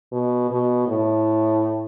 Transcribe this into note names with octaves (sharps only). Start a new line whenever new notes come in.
B2
B2
A2